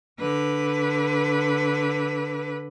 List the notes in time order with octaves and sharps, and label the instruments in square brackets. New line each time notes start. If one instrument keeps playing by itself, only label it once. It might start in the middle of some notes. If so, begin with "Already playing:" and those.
[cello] D3 B4